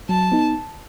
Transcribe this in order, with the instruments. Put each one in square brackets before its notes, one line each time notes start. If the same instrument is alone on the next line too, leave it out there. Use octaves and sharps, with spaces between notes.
[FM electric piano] F#3 [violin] A5
[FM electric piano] B3 D#4